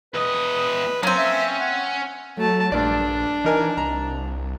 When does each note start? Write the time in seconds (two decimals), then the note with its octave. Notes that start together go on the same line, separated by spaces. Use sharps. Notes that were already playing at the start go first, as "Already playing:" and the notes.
0.14 E2 B4 D#5
1.03 F#3 A#3 C4 C#4
1.18 E5
1.60 F#5
2.37 F#3 A3 A5
2.72 A#1 G2 D4 D5
3.44 E3 D#4 A#4 G#5
3.77 C2 A#5